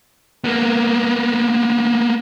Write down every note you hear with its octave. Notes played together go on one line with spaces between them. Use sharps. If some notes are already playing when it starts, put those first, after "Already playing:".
A#3 B3